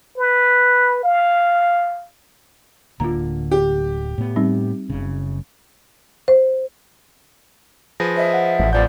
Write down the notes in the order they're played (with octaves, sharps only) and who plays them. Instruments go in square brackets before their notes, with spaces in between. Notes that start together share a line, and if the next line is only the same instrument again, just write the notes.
[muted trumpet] B4
F5
[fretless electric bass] D1 D3 A#3 [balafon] F4 A#5
[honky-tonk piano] G4
[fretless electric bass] A2 B3
[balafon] G3 C4 D#4
[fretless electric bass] F#1 C#3
[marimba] C5
[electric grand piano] F3 G#4 B4 [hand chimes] A#6
[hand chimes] C5 D#5 [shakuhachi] E5
[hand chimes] F#5
[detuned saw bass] A1
[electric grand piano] F2 F3 G6 [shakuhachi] D5